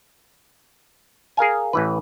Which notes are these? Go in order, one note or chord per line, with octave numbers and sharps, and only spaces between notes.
G#4 A#4 F5 G#5
A1 E3 B4